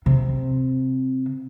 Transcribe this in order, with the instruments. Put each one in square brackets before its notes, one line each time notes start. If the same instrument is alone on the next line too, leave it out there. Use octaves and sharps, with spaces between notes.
[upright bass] C3